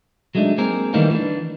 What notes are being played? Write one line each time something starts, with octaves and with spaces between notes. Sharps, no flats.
F#3 G#3 A3 D4 D#4
A#3 C4 G#4 A#4
D#3 E3 G3 A3 A#3 D#4
E3 D4